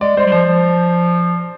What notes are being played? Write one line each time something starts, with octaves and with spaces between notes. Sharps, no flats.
G#3 D5
G#3 C5
G3
F3 C5
F3